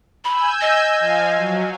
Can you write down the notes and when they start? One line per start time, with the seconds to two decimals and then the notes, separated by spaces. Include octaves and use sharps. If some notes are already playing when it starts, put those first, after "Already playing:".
0.25 G#5 B5 E6 G6
0.61 D#5
0.99 F3 F5 G#5
1.37 F#3